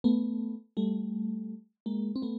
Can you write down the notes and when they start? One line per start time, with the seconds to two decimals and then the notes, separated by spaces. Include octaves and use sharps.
0.04 A3 B3
0.77 G3 A3
1.86 G#3 A#3
2.16 C4
2.22 A3 B3